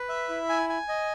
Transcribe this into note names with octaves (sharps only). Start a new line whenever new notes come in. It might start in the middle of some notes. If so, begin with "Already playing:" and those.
Already playing: B4
E5
E4
G#5
G#5
D#5